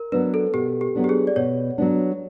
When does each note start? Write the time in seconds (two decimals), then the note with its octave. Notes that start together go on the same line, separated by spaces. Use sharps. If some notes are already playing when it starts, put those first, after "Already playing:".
Already playing: A#4
0.12 F#3 B3 D4 B4
0.34 A4
0.54 B2 G4
0.81 G4
0.95 F#3 B3 D4
1.04 G4
1.09 G#4
1.27 D5
1.36 B2 C#5
1.78 F#3 B3 D4